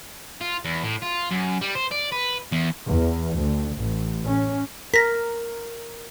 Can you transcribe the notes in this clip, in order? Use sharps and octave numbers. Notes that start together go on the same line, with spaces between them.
F4
E2
A2
F4
F#2
G3
C5
D5
B4
E2
E2
D2
A1
C#4
A#4 A#6 B6